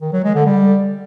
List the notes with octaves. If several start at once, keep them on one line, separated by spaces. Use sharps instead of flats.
D#3
F#3
G#3
D3
G3